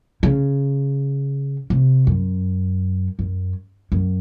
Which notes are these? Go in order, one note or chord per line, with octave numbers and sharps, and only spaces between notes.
C#3
C3
F#2
F#2
F#2